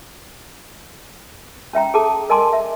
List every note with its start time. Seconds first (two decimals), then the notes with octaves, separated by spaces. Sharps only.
1.73 C#4 E5 G5 A#5
1.94 G#4 A4 A5 D6
2.29 A#4 D#5 G#5 A5 C6 D6
2.53 E5